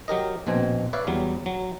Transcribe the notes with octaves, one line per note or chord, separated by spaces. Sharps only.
F#3 G4 A#4 D#5
A#1 B2 C4 G#5
B4 C#5 D5 E5 F5
E2 F#3 G3
F#3